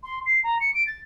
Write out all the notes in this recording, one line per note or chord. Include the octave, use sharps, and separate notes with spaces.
C6
C7
A#5
C#7
D7
A6